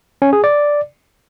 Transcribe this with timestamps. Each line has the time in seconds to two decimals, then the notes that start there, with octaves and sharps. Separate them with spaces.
0.22 C#4
0.33 G#4
0.44 D5